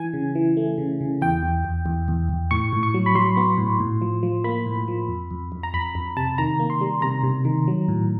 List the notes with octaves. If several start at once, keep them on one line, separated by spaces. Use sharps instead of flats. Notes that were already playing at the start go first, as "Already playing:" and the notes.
Already playing: E3 G#5
C#3
E3
A3
C#3
C#3
E2 G5
E2
E2
E2
E2
E2
A2 C#6
A2
C#6
F#3
B5
F#3 C6
B3
A2
A2
F3
F3
A#3 B5
A2
F3
F2
F2
F2
A#5
F2 B5
F2
C3 A5
D#3 A#5
A#3
C6
G3
C3 A#5
C3
D#3
F#3
A2